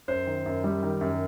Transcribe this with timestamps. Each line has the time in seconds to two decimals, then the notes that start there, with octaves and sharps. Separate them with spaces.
0.08 F#2 C5
0.27 D#3
0.46 F#2
0.64 G3
0.83 D#3
1.01 F#2